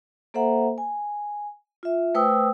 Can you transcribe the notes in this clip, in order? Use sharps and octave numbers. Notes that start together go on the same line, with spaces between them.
A#3 A4 C5 E5 F#5 A#5
G#5
F4 E5
A3 B4 C5 G5 D#6 E6